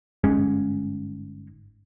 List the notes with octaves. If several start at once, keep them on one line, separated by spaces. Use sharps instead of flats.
G1 G#2 G#3 C#4